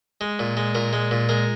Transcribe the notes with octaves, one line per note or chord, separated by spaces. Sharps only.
G#3
A#2
G#3
A#2 A#4
G#3
A#2
G#3 A#4